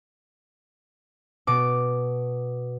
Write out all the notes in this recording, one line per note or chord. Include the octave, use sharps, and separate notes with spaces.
B2 D6